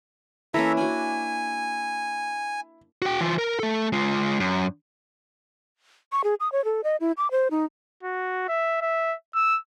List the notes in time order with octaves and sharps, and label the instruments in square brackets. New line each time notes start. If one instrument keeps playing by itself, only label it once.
[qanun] E3 A#3 C#4 [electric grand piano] E4 [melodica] A4 E5 A#5
[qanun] D4 F#4 [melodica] G#5
[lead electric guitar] F#4 G5
E3 F4
A#4
A3 A4
G#3 F4
F#2
[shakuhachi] C#6
G#4
D#6
C#5
A4
D#5
E4
D6
C5
D#4
[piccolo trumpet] F#4
E5
E5
E6